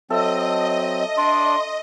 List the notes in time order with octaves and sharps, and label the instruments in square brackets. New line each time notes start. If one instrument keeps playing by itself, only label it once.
[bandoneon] F#3 C4 [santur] A4 E5 [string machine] D#5
[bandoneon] D4 D5 [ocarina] C6